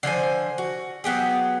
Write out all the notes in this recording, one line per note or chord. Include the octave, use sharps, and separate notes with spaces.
D3 F3 C5 G#5
F#4
F#3 B3 G4 G#4